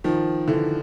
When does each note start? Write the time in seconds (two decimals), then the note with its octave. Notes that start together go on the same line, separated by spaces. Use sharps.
0.04 D#3 F3
0.48 D3 E3